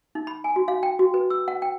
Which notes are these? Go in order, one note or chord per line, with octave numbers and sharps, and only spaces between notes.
D#4
B5
G#5
F#4
F5
G5
F#4
B4
E6
F#5
G5